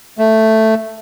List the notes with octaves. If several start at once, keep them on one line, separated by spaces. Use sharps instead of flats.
A3